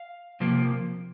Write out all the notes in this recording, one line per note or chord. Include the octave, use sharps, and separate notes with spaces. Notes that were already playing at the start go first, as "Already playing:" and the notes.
Already playing: F5
C3 F3 A#3